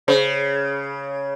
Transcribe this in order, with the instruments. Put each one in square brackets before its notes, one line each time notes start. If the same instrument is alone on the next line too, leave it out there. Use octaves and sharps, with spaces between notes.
[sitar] C#3 [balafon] C5